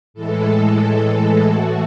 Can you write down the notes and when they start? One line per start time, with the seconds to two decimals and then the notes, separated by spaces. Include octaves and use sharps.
0.14 A2 E3 G#3 A4
1.45 A2 E3 A3 F#4